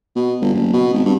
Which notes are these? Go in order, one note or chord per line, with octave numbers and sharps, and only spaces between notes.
B2
G1
F#1
B2
G#1
G2